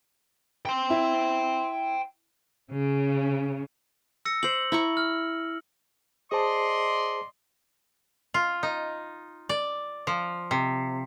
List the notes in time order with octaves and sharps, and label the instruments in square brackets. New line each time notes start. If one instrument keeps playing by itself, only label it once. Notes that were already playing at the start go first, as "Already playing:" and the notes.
[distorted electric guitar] G5 C6
[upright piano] E4
[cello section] C#3
[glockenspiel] E6 A#6 C#7
[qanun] C5 D6 [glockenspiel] F#7
[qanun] E4 A#5 C#6
[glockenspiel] F6
[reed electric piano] G#4 C5 A5 [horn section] D5 D#5 C6
[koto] F4
D#4
D5
F3
C3